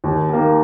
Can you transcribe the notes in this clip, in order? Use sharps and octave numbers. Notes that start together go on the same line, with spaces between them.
D#2
D#3 A#3